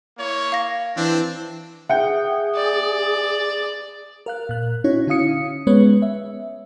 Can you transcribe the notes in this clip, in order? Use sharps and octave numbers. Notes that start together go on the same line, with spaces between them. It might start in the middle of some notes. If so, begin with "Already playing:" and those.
A#3 E4 C#5
F5 A#6
E3 C4 D4
G#4 E5 F#5 G5
D5
A#4 F5 F#6
A#2 F#6
C#4 D#4 E4 F#4 C#5
D3 C#4 E4 F5 D#6 C#7
G#3 B3 C#4 B4 C#5
E5